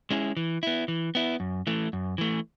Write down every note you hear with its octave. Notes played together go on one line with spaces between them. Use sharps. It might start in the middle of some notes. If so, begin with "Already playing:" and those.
G#3 C#4 E4 G#4
E3
B3 E4
E3
B3 E4
F#2
E3 A3
F#2
E3 A3